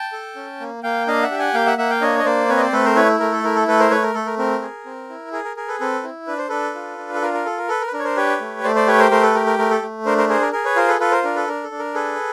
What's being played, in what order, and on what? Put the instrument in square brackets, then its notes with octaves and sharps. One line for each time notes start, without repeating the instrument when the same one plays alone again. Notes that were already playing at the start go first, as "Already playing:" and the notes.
Already playing: [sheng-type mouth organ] G5 A5
A4
C#4
A#3
A#3 F5 G5
D4 D#5 F5
E5 F#5
G4
F#5 G#5
A#3 F5 G5
E5 F#5
A#3 E5 F#5
F5 G5
D4 C#5 D#5
D#5
A#3 C5 D5
C4 B4 C#5
D#5
C5 D5
A3 A4 B4
A#4 C5
E4 B4 C#5
A3 A#4
A4
E4 A#4
A4
A3 A4 B4
A#4 C5
A3 B4 C#5
A#4
A3 A4
A#4
C4 A#4
G#4
C4
E4
G#4 A#4
A#4
G#4 A#4
A4 B4
C4 A4 B4
E4
D4 B4
C5
D4 A4 B4
F4
D4
A4
F4 A#4
A#4
A4
A#4
A4 B4
A#4
B4
D4 A#4
C#5
A#4 C5
G4 B4 C#5
A3
A3 C5 D5
C5 D5
G4 B4 C#5
A#4 C5
A3 A#4 C5
A4 B4
G4 A#4
A#4
A3 A#4
A4
A3
D4 A#4 C5
A#4 C5
G#4 A#4 C5
A#4
G#4 A#4
B4 C#5
F4 A#4 C5
A4 B4
F4 A4 B4
A#4 C5
D4 A#4
A4 B4
D4 A#4
A4
D4
A#4
G#4 A4 B4